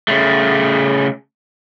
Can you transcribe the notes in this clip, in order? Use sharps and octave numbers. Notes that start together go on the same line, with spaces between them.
C#3 A3